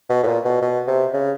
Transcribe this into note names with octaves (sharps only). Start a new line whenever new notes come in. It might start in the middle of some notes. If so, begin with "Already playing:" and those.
B2
A2
A#2
B2
B2
C3
C#3